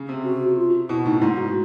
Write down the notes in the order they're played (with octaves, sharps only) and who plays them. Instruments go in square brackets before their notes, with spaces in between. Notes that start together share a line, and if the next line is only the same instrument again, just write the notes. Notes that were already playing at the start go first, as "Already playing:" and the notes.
Already playing: [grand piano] C#3
C3
[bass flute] F#4
F#4
F4
[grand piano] B2 [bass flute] E4
[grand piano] A2 [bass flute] D#4
[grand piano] G#2 [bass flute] E4
[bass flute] F#4